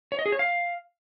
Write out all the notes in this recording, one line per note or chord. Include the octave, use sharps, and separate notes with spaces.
C#5
D#5
G#4
C#5
F5